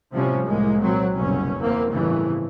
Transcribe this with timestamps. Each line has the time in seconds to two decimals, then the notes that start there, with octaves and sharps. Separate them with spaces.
0.13 A2 C3 F3 G3 C#4
0.45 C2 A2 G#3 A#3
0.82 A#2 F#3 C4
1.15 F#1 C2 B2 C#4
1.59 E2 A#3 C4
1.91 G1 F2 A2 C#3 E3